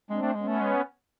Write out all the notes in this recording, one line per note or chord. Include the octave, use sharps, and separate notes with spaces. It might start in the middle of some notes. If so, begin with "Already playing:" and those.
G#3 C4 D4
A3
G#3
B3 C#4
A3
G#3